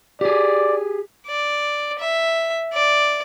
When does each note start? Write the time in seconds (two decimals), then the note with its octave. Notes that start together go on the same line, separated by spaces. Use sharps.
0.21 G4 G#4 D5
1.27 D5
1.99 E5
2.73 D5